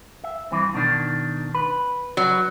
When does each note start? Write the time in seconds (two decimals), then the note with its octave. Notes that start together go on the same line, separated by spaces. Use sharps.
0.24 E5
0.52 G2 E3 C4
0.74 B2 D#3 D4
1.55 B4
2.17 F#3